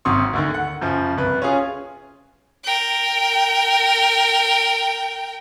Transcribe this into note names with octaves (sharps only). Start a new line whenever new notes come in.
G#1 C3 F#3 C6 C#6 D#6
D2 D3 D#3
F#5
F#2 C#3 F3
C2 B4
C#4 F4 G#4
A#4 G5